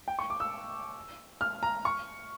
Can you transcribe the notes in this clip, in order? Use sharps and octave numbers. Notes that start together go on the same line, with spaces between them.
G5
C#6
D6
E6
F6
A#5
C#6